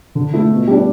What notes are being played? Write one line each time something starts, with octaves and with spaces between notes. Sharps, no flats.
D3
A3 E4
B2
G3 D4